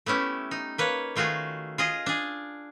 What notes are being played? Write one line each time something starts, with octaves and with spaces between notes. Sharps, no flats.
A3 B3 C#4 E4 G4
D#4
A#3 B4 C#5
D#3 A3 F4 F#4 G#4
F4 G#4 D#5
D4 G#4